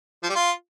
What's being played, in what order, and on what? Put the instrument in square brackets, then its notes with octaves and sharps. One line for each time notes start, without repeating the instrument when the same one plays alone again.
[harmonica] F3
G3
F4